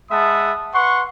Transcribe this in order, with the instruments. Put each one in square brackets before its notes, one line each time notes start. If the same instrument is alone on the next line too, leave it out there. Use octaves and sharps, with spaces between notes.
[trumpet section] G#3 E5 F#5 A5 B5 D#6
B4 F#5 C6 C#6